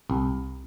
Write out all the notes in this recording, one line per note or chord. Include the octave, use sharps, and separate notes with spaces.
C2